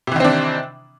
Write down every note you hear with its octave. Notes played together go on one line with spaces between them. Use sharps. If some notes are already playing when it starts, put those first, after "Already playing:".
C3 D#3 E3 C4 D4